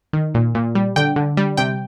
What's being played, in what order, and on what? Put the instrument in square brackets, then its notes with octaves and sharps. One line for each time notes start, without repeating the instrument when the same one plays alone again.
[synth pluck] D#3
A#2
A#2
G3
D3 G5
D3
G3
C3 G5